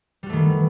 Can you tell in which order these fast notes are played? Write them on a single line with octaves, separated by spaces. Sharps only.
G3 F#4 A3 D#3 E3